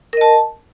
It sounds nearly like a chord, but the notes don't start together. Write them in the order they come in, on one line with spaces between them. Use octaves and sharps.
A#4 D#5 A5